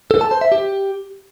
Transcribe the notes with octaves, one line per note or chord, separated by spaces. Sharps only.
A4
A5
C5
E5
G4